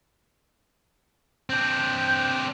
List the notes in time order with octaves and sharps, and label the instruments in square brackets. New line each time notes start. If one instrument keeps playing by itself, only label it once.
[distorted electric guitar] C4 D4 [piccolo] G6